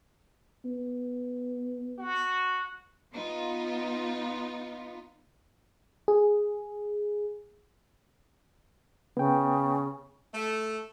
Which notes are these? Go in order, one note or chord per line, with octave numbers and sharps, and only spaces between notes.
B3
F#4
B3 D#4 F4
G#4
C#3 B3 G5
A3